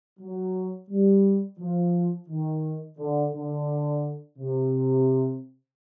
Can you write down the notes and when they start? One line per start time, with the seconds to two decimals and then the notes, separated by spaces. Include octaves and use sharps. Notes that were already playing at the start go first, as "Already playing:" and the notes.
0.20 F#3
0.90 G3
1.59 F3
2.29 D#3
2.98 D3
3.34 D3
4.38 C3